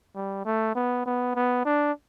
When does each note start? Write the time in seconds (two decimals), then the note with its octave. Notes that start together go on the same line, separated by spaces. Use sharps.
0.15 G3
0.45 A3
0.75 B3
1.06 B3
1.35 B3
1.65 D4